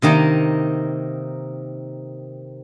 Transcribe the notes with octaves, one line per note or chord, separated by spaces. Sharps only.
C3 D#3 A#3 D#4